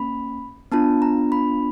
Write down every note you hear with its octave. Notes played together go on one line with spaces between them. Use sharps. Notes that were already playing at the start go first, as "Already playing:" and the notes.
Already playing: A#3 C#4 B5
B3 D4 F4 A5
A#5
B5